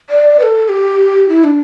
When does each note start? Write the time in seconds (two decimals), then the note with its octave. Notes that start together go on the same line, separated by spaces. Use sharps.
0.10 D5
0.39 B4
0.43 A4
0.69 G4
1.29 E4
1.44 D4